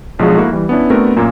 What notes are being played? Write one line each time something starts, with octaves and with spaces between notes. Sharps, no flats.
B1 F3 G#3 D4 F#4 G#4
A#3 E4 F#4 A4
E3 G3
B3 C#4 D4 E4
A3 B3 C4 D4 F#4 A#4
F#2 A#2 A#3